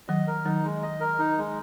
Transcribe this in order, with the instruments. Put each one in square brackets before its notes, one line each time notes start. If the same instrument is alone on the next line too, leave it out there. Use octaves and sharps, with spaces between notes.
[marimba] D#3 F#3 [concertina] D#5
[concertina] A#4
[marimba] D#3 F#3 [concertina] D#4
[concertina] G#3
D#5
A#4
D#4
G#3